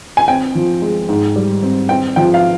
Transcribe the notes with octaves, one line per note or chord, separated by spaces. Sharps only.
G#5
C4 G5
F3
G#3
G#2
G3
C4
C4 G5
F3 G5
F5